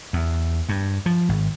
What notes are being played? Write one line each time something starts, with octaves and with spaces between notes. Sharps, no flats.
E2
G2
F3
G#1